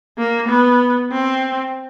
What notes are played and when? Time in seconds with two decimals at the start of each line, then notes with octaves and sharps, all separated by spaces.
0.18 A#3
0.48 B3
1.12 C4